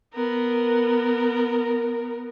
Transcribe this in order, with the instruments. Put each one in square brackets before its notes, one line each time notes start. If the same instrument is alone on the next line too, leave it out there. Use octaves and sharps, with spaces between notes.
[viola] B3 A#4